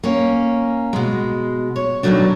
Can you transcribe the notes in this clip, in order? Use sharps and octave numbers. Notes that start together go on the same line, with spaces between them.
A#3 C#4
B2 G#3
C#5
B2 D#3 F3 F#3 A3 D4